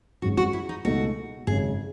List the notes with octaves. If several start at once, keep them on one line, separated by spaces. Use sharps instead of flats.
G#1 G#2 F#3 C#4 F#4 G#4
F#4
E4
D#4
C#2 B2 A3 D#4 F#4 A4
G#1 F#2 C#3 G#4